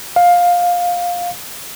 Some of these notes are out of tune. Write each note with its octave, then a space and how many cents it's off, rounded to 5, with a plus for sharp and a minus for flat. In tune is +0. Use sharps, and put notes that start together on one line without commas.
F5 +15